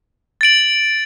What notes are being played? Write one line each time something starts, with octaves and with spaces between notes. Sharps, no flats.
A6 D7 F#7